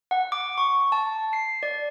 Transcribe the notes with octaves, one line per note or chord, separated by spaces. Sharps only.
F#5
D6
C#6
A5
C7
D5